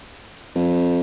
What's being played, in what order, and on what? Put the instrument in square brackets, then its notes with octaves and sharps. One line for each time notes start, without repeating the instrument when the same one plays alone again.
[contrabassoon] F2